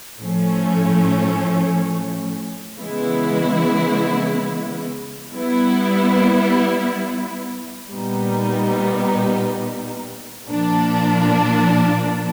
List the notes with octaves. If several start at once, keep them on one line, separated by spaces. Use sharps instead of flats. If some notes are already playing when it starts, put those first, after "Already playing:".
A2 F3 A3 C#4
C#3 E3 G#3 B3 E4
G3 B3 E4
A#2 G3 B3 D#4
A#2 F3 A#3 D4